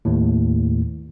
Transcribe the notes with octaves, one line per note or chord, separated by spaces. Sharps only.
D#2 A2